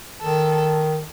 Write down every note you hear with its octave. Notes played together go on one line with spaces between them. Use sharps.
D#3 A4